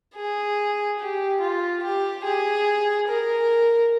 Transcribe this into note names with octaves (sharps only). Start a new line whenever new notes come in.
G#4
G4
F4
G4
G#4
A#4